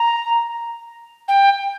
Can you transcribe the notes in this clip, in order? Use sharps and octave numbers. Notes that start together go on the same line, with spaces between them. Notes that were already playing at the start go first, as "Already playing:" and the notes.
Already playing: A#5
G5